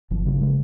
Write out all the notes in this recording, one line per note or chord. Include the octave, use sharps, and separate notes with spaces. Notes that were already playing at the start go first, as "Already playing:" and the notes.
G1 F3
C#3 G3
G#3